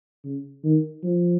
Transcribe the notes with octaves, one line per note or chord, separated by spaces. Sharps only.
C#3
D#3
F3